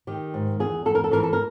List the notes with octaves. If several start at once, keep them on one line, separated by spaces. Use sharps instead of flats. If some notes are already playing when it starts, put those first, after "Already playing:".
D#3 G4
G#2
E2 G#4
E2 A4
A#4
A4
E3 A#4
A4
A#4